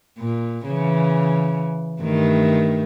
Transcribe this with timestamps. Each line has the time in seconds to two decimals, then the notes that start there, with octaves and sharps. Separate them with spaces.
0.18 A#2
0.64 C#3 E3
2.02 G2 D#3 A3